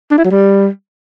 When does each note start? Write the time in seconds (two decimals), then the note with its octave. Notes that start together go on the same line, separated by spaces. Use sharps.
0.11 D4
0.18 E4
0.25 F#3
0.31 G3